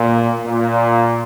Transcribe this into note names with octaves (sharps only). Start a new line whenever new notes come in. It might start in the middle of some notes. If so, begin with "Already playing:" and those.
Already playing: A#2
A#2